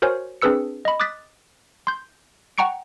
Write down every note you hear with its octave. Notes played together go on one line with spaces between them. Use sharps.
F#4 A#4 C5 C#5 G#5
C4 D4 G#4 B4 E6 C#7
D#5 B5
D6 D#6 F#6 A6 B6
C6 G6
F#5 G5 A#5 C#6 C#7 D7